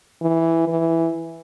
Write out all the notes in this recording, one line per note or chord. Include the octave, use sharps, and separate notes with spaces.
E3
E3